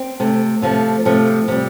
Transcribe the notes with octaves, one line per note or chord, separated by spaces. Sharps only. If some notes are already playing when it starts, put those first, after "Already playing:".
Already playing: C4
C3 A3
C3 F3 A3
C3 F3 A3
C3 G3